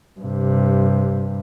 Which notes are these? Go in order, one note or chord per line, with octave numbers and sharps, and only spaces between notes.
G2 C3